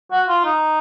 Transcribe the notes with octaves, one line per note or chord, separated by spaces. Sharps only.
F#4
F4
D#4